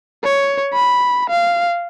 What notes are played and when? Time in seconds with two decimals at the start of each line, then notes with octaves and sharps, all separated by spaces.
0.24 C#5
0.73 B5
1.30 F5